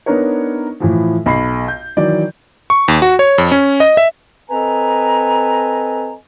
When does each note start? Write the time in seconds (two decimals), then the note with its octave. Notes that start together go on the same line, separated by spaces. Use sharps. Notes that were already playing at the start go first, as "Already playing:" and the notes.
0.06 B3 D4 D#4 A#4 B4 C#5
0.80 A2 E3 F3
1.26 B1 B5 C7
1.68 G6
1.97 D#3 E3 F#3 D5
2.70 C#6
2.88 D#2
3.02 F#4
3.19 C#5
3.38 F2
3.52 C#4
3.80 D#5
3.97 E5
4.50 C4 A4 B4 D#5 G#5 A#5